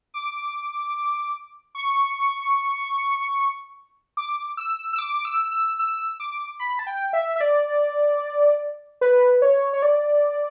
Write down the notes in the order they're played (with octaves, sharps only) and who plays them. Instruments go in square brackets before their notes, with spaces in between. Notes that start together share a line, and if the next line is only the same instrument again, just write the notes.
[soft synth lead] D6
C#6
D6
E6
E6
D6
D6
E6
E6
E6
D6
B5
A5
G5
E5
E5
D5
B4
C#5
C#5
D5